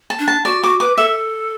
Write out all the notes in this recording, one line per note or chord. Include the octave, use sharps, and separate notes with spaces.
A5
D4
A5
F#4 D5
F#4 D6
B4 D6
A4 E5